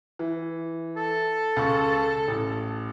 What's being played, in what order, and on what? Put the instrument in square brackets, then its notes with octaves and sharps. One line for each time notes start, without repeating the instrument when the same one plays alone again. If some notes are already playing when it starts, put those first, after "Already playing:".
[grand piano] E3
[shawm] A4
[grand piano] C#2 C#6
A1